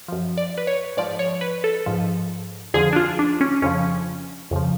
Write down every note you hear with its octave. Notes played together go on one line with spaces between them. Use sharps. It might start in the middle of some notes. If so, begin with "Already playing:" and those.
F#2 F3
D5
B4
C#5
G#2 F3 D5
C#5
B4
A4
G#2 F3
F2 D3 F3 G#4
D4
F4
D4
C#4
F2 C#3 F3 C#4
F2 C#3 F3